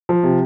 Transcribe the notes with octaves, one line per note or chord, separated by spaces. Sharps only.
F3
C3